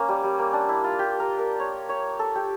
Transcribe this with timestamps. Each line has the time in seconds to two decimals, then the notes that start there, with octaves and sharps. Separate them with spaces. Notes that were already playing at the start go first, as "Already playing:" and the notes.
Already playing: A#3 C#4
0.09 G3
0.23 G3
0.39 A#3
0.53 D4
0.69 E4
0.84 F4
0.99 G4
1.20 A#4
1.39 A#4
1.60 C#5
1.89 C#5
2.19 A4
2.35 G4